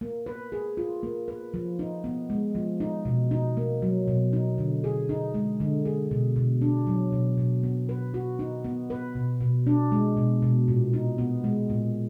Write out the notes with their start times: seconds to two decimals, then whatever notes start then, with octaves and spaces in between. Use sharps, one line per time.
0.01 A#3
0.26 B4
0.52 G#4
0.77 F4
1.03 A#3
1.28 B4
1.54 F3
1.79 D#4
2.04 B3
2.30 G#3
2.55 F3
2.80 D#4
3.05 B2
3.31 D#4
3.57 A#3
3.82 F#3
4.08 B2
4.33 D#4
4.58 D3
4.84 G#4
5.09 D#4
5.34 G#3
5.60 D3
5.85 G#4
6.11 B2
6.36 B2
6.61 D4
6.87 F#3
7.12 B2
7.38 B2
7.63 B3
7.89 B4
8.14 F#4
8.39 D#4
8.64 B3
8.90 B4
9.15 B2
9.41 B2
9.67 D4
9.92 G#3
10.17 B2
10.42 B2
10.68 A#2
10.93 D#4
11.18 B3
11.44 G#3
11.70 A#2